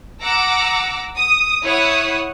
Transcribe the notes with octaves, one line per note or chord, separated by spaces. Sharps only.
F#5 A#5 D6 E6
D#6
E4 C#5 F#5 D#6